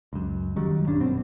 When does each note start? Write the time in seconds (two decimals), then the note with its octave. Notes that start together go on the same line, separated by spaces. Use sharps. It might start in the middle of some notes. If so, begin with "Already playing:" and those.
0.13 C#2 F#2
0.56 F#1 D#3 F#3 G3
0.86 A#1 G2 C#4 D4
1.01 F#2 B2 C4